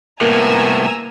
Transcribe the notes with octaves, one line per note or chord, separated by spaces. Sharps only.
C2 A2 A#3 B3 G#5 A#5 E6